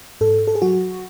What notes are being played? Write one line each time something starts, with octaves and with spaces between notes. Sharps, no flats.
G#2 A4
A4
G#4
F#3 F#4